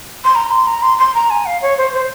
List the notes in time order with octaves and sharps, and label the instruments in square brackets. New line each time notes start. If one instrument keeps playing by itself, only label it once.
[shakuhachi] C6
A#5
C6
A#5
C6
C6
A#5
G#5
F5
C#5
C5
C5